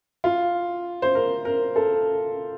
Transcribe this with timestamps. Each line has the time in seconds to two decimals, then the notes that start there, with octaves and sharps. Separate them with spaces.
0.24 F4
1.02 C5
1.15 A#4
1.45 A#4
1.76 A4